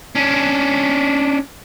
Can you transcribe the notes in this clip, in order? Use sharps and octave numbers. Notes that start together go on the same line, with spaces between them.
C#4 D4